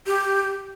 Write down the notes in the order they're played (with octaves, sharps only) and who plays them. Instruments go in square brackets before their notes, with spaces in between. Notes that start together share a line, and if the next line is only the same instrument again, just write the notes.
[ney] G4